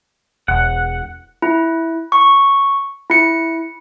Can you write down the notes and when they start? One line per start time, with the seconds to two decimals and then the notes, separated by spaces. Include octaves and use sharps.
0.48 E1 F#5
1.42 E4
2.12 C#6
3.10 E4 C#7